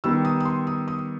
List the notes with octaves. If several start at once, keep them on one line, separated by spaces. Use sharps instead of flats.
D#3 G3 B3 D#4 E6
D#6
D#6
C6
D#6
D#6